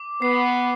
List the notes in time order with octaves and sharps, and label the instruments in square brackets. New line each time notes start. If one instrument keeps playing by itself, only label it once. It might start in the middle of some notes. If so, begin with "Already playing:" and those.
Already playing: [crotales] D6
[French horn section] B3 [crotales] C7